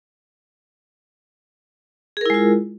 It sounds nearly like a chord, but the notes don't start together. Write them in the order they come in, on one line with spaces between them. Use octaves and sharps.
G#4 A#4 E4 G#3 F4